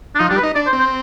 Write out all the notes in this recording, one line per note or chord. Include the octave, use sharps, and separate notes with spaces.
D4
F3 D#4
G3 D4
B4
D#4
D4 D5
C5
C4
C5